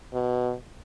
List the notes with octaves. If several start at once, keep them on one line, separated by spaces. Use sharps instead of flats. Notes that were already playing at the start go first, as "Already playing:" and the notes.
B2